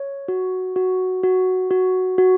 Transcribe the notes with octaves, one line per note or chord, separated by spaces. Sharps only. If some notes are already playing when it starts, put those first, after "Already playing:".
Already playing: C#5
F#4
F#4
F#4
F#4
F#4